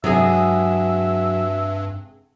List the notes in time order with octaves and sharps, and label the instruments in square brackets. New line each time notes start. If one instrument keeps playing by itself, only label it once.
[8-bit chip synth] G2 [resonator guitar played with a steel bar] C3 G#3 G#4 [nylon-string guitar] F#3 [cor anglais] E5